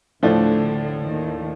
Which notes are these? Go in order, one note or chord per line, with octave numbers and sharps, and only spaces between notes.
D2 A2 D3 F3 A3 D4
D#2 D#3